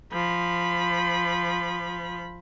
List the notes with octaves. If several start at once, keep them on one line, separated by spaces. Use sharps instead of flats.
F3 B5